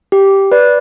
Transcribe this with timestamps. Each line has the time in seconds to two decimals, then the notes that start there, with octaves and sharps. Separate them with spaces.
0.12 G4
0.52 B4 D5